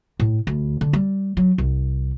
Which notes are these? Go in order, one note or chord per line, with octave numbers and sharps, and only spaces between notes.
A2
D2
D3
G3
F#3
C2